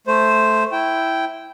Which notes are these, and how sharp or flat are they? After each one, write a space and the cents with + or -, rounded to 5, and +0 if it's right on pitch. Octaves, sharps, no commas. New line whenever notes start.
A3 -5 C5 +0
E4 +0 G5 -10